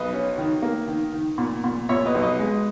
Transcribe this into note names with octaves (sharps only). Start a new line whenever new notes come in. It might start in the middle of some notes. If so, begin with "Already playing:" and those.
Already playing: B1 B4 D#5
C#4
D#3
A#3
D#3
D#3
A#2
A#2
A#2 C#5 E5
B4 D#5
B1
B4 D#5
G#3